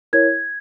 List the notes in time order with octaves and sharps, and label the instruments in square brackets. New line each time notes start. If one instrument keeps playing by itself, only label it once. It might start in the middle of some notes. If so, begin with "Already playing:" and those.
[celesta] E4 A#4 C#5 G#6